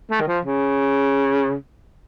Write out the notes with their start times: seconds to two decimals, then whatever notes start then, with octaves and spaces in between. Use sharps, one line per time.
0.10 A3
0.20 D#3
0.28 F3
0.45 C#3